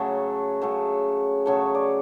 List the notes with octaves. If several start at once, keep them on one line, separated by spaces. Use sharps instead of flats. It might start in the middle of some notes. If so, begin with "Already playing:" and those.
Already playing: C#3 F#3 A3
C#3 F#3 A3
C#3 F#3 A3 C#5
D5